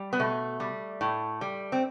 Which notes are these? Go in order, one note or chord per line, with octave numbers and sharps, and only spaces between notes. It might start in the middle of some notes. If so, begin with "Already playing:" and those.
Already playing: G3
B3
B2 A3
G3
A2
G3
C4